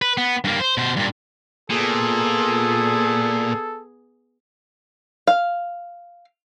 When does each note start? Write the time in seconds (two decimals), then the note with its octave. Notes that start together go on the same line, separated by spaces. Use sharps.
0.02 B4
0.17 B3
0.44 G2 A#3
0.60 C5
0.78 B2 C5
0.97 G2 A#2
1.70 A#2 B3 G#4 A4
5.27 F5